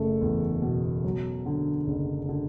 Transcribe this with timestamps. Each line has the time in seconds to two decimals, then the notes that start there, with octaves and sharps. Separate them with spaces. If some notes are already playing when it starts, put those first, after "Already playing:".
Already playing: F#1 A3 A4
0.21 E2
0.62 B2
1.04 F#3
1.46 D3
1.87 F#1
2.29 D3